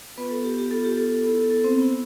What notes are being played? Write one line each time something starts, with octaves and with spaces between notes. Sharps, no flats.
B3 F4 B4
A4
G4
G4
B3 F4 A4
G4
A4
A4
B3 E4 A4
A4
A4
C4 C5
B3 E4